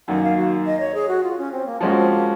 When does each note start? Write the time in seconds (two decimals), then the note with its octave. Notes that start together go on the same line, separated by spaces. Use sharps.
0.08 F#2 D#3 A#3 F#5
0.23 F5
0.37 F#4
0.66 D#5
0.80 C#5
0.95 G#4
1.08 F#4
1.23 F4
1.38 C#4
1.52 C4
1.66 A#3
1.80 F3 G#3 A#3 C#4 F#4
1.95 C4
2.10 A#3